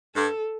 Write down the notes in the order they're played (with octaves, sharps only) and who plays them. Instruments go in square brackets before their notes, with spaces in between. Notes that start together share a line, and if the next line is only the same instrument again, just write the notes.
[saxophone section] G2 [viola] A4